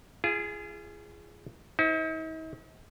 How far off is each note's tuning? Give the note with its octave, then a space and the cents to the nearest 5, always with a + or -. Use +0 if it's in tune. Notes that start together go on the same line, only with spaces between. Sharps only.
F4 -35 G#4 +0
D#4 +45 C5 +0